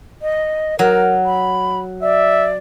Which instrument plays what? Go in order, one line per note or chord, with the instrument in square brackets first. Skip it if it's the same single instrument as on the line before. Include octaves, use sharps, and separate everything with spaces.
[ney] D#5
[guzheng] F#3 [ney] A#4
[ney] B5
[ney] D5 [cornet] E5